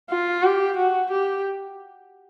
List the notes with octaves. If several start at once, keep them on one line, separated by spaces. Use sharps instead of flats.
F4
G4
F#4
G4